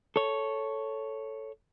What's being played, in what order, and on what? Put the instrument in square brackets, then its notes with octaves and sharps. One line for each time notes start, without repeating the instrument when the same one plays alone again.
[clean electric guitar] A4 C#5